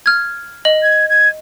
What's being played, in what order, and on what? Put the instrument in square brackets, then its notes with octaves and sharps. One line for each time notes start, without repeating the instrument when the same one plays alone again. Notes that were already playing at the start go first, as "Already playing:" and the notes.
[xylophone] F6 G#6
D#5 F#7
[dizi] G#6
G#6